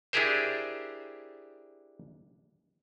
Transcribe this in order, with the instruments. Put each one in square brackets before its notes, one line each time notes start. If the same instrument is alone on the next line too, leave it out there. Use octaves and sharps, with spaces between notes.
[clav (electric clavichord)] D4 E4 G4 G#4 A#4 C5